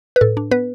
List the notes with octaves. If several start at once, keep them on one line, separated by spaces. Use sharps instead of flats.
B4
A2 A4
D4
B3 B4